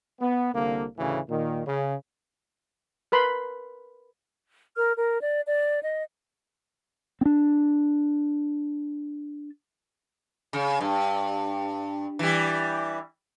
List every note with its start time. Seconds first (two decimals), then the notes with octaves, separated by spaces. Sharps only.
0.20 B3
0.53 C2 D3 A#3
0.98 D2 A2 C#3 E3
1.29 A#2 D#3
1.66 C#3
3.12 A#4 B4 B5 C6
4.77 A#4 F6
4.96 A#4
5.21 D5
5.47 D5
5.84 D#5
7.21 C4 D4
10.53 C#3
10.81 G2
12.19 E3 G3